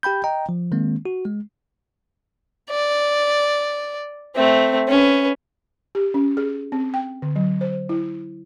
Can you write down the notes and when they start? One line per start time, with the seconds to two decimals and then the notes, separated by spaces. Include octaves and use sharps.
0.03 G4 G5 B5 G6
0.24 D#5 G5 A#5
0.49 F3
0.72 D#3 G#3 A#3 C4
1.05 F#4
1.25 G#3
2.70 D5
4.35 A3 C4
4.88 C#4 B4
5.95 G4
6.14 C#4
6.37 G#4
6.72 C4
6.94 G5
7.22 D3
7.36 F#3
7.61 C5
7.89 E4